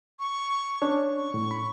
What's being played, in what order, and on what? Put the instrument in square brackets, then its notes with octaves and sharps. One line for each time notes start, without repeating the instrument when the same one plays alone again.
[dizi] C#6
[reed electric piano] C#4 D4 C#5
[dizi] C#6
[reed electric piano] A2
B5